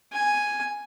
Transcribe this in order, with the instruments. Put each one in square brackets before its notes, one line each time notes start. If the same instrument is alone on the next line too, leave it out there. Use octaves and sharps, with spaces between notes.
[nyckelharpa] G#5